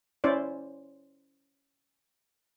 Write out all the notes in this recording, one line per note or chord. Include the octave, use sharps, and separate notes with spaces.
C#4 E4 C5 D5